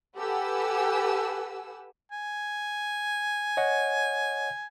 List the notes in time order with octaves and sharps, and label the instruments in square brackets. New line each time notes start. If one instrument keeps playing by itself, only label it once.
[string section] G4 A4 B4 F#5 G#5 E6
[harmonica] G#5
[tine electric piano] C#5 D#5 F#5